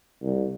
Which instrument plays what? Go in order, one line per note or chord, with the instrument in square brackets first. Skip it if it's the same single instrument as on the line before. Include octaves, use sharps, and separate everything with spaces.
[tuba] C2